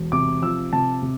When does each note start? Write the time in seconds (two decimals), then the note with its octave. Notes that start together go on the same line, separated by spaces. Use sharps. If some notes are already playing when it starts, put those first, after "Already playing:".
Already playing: E1
0.12 C3 D6
0.42 F3 E6
0.73 C3 A5
1.03 C3